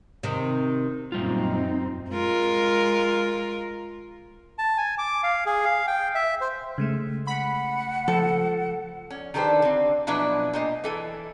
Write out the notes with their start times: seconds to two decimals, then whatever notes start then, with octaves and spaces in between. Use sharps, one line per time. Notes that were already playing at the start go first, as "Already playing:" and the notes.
0.23 C3 D#3
1.12 F#2 A#2 G3 C4 D#4 F4
2.10 G#3 F4 A#4
4.58 A5
4.78 G#5
4.98 D6
5.23 F5
5.46 G#4
5.65 F5
5.87 G5
6.15 E5
6.41 C5
6.78 C#3 G#3 A3
7.27 F#5 B5
8.08 F3 A4
9.10 C#4
9.34 D#3 D4 G4 A4 B4 C5
9.62 D3 C4
10.07 B2 F3 F#3 D4 E4 B4
10.53 A#2 C5 D#5
10.84 E3 A4 G#5